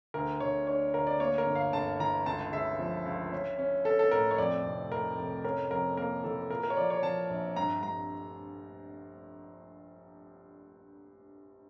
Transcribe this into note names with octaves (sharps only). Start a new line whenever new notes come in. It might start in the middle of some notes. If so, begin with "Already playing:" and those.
D2 A#4
D2 C#5
D4 C#5
D2 A#4
D5
A#3 C#5
A#4
G1
F5
G1 A5
E3 A#5
C#2 A5
C#3 E5
F3
C#2
C#4
C#4
C#4 A4
A4
A2 A#4
C#5
F2 D5
F1
F1 A#4
F1
C#4 A#4
F2 A#4
A#3 A#4
E3 A4
A#2 A#4
A#4
C#5
F3 D5
C#5
F3 A5
A#1
G2 A#5
G2 A#5